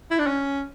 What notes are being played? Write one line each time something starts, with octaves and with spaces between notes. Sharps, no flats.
E4
D4
C#4